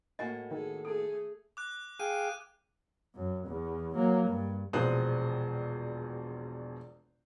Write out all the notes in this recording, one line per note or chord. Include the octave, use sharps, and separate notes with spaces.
A2 A#3 F#4 D#5 F#5 G#5
D#3 G#4 A4
A3 G#4 A4 A5
D6 F#6
G#4 F5 G5 D#7
F#2
E2
F#3 A#3
G2
E1 A#1 B2 C5 D#6 F#6